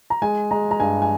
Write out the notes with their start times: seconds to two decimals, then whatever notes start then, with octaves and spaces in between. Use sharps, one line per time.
0.10 A#5
0.22 G#3 G#5
0.51 G#3 A#5
0.71 A#5
0.80 G2 G#5
1.02 G#5